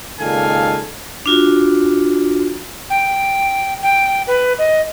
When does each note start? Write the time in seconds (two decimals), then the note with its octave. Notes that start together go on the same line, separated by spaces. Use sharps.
0.20 C#2 A#2 D#3 A4 F5 G#5
1.26 D4 F4 F#4
2.90 G5
3.82 G5
4.27 B4
4.59 D#5